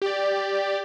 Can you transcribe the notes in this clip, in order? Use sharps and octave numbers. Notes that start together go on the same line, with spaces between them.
G4 D5